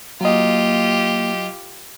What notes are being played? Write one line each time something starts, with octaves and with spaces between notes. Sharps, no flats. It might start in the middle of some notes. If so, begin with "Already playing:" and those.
F#3 A#3 F4 G4 D#5